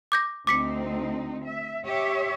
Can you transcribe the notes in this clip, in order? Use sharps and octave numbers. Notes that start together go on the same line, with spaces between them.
D6 G6 A#6
D2 C4 D#4 D6 B6 C#7
E5
G4 C#5 E5